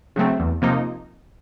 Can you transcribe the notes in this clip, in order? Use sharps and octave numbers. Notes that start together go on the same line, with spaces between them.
C#3 F#3 A3 C4
E2
C3 F3 A#3 D#4